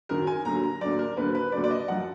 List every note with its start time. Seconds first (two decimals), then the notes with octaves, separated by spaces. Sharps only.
0.09 F#2 D#3 F#3 A#4
0.27 G#5
0.45 D#2 D3 F#3 A#5
0.64 A#5
0.81 D#2 D3 F#3 D5
0.99 A#4
1.17 D#2 D3 F#3 B4
1.35 B4
1.52 D#2 D3 F#3 D5
1.64 D5
1.71 D#5
1.88 F#2 F3 F#5